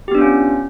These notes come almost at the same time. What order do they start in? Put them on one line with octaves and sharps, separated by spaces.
G4 B3 D4 F4 C#4